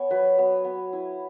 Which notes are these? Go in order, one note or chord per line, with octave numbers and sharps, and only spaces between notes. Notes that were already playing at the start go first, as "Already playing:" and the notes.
Already playing: B3 C#5 G#5
F#3 B4
B3
B3
E4